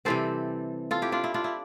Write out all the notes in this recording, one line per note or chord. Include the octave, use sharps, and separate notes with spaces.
C3 E3 G3 C4 A4 C5
F4 A4
E4 G4
D4 F4
E4
D4 F4
E4